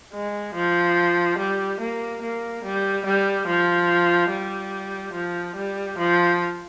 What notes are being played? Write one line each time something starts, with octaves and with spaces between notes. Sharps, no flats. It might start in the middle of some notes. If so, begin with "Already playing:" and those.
G#3
F3
G3
A#3
A#3
G3
G3
F3
G3
F3
G3
F3